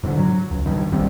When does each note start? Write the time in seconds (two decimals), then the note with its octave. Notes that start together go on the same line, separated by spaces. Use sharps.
0.03 G#2 D3
0.17 F#3
0.51 C#2
0.66 G2 D#3
0.92 A#1 G#2 G3 C4